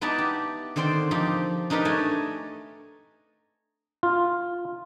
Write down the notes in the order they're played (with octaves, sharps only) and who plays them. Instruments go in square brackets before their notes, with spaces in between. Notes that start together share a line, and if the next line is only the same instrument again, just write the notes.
[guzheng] B3 D#4 E4 B4 D5 A5
G4
D3 D#3 C4 C5 D5 C6
F3 D#4 G4 A4
D4 D#4 G4 A#4 B4
A3 A4 C#5 D#5 G#5 A5
[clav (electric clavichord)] F4